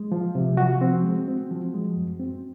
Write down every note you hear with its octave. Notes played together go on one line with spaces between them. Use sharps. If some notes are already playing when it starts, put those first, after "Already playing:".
Already playing: G#3
F3
C3
F3 F#4
C4
G#3
C4
F3
G#3
F#2
C4